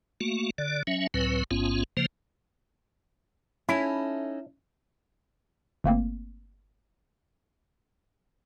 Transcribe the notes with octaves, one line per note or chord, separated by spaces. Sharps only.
A3 A#3 F#4
D3 D5
F#3 C#4 E5
C#2 A2 F#3 C4 B4
A1 G#2 B3 C#4 F4
C#3 F3 A#3 C5
C#4 D#4 E4 A4
G1 A3 A#3 C4